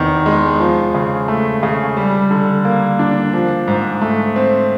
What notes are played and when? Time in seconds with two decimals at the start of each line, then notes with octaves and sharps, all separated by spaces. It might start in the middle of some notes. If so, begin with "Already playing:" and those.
Already playing: E2 C3 D#3
0.26 G#3
0.60 F3
0.95 C#3
1.28 A3
1.63 C#3
1.97 G3
2.31 D3
2.65 A#3
2.99 D4
3.33 F3
3.68 G#2
4.01 A3
4.36 C4